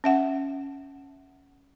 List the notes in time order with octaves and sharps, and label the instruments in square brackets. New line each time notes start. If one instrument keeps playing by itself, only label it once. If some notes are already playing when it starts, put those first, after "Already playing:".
[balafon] C#4 E5 F#5